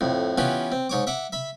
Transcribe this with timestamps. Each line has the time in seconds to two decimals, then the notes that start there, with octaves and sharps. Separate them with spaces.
0.01 F2 A2
0.38 E3 B3 C#4 F4 G4
0.72 C4
0.89 G#2 C#5 D6
1.07 E5 F#5 D6
1.32 E5 B5